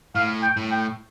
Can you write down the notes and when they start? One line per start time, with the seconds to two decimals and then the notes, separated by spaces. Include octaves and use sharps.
0.15 A2 F5
0.42 G5
0.57 A2
0.71 G5